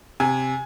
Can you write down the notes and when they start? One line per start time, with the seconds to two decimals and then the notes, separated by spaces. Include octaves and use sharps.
0.20 C3 G#5